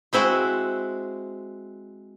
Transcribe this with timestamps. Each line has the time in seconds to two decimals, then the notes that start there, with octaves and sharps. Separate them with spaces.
0.13 G#3 C4 E4 F#4